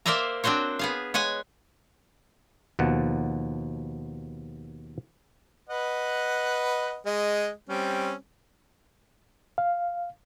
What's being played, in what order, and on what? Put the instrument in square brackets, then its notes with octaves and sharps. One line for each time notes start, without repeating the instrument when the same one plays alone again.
[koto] A#3 A#4 C5 D5 E5 A#5
C4 D4 F#4 C5 C#5
B3 G#4 F5
G#3 C#5 F#5 G#5
[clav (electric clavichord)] D#2 B2 F3 F#5
[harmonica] B4 D#5 F#5
G#3 D#5
G3 C4 C#4
[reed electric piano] F5